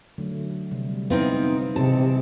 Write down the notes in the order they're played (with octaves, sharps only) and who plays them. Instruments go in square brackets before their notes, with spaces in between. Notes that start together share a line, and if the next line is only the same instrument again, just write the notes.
[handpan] D3 F#3 A3
C3 G3
[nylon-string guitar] B3 C4 D#4 [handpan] E4 F5
[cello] C3 [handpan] E3 G#4 D#5 [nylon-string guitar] A5